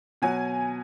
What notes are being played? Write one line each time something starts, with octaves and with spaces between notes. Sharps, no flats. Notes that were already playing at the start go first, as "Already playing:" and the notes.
B2 F#3 G#5